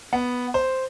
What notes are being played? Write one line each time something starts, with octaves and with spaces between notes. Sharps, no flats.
B3
C5